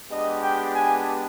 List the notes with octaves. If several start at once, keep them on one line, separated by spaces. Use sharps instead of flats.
G#3 B3 D4 G4 D#5
G5
G#5